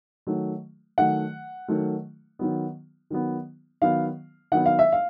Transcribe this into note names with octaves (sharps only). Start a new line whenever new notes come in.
D#3 F#3 A3
D#3 F#3 A3 F#5
D#3 F#3 A3
D#3 F#3 B3
D#3 F#3 B3
D#3 F#3 B3 F5
D#3 F#3 B3 F#5
F5
E5
F5